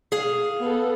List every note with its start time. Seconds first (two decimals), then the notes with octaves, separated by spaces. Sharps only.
0.12 G#4 F5
0.62 B3 A4